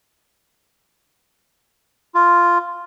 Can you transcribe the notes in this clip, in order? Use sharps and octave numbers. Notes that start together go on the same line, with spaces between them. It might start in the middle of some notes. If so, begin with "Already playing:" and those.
F4